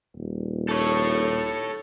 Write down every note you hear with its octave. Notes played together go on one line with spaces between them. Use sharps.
D#1
A4 C#5